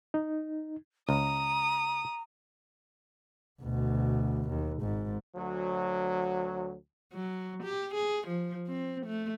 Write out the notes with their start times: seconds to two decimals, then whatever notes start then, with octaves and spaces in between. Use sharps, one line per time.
0.14 D#4
1.09 C#2 A#5 D#6
3.62 D2 B2
4.49 D#2
4.81 G#1 G#2
5.36 D2 F#3
7.14 F#3
7.63 G4
7.94 G#4
8.27 F3
8.67 C4
9.06 A3